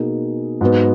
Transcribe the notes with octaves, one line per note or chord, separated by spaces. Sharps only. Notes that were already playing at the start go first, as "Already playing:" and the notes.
Already playing: B2 A#3 D#4 G#4
G#2 F#3 B3